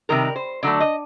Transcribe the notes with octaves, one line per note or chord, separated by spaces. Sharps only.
C3 D#3 G3 A#4
C5
D3 F#3 A3 D5
D#5